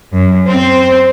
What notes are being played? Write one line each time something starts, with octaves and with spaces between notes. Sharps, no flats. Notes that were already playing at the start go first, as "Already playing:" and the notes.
F#2
C4 C5